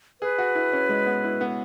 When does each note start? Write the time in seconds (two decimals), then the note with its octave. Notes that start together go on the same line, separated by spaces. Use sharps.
0.21 G#4 B4
0.38 F#4
0.55 E4
0.73 C#4
0.89 G#3
1.06 B3
1.24 E4
1.41 B3